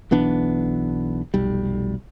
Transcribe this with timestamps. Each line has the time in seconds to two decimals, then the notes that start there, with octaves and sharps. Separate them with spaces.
0.11 B1 E3 B3 D4
1.34 F1 B1 G3